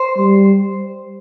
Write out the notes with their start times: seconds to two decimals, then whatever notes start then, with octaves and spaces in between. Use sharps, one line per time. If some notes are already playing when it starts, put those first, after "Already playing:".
Already playing: C5
0.17 G3